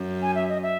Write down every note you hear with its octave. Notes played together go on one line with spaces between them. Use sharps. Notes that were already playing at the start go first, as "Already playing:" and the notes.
Already playing: F#2
G#5
E5
D#5
E5